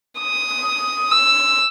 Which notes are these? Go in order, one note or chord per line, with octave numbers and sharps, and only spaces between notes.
D#6
E6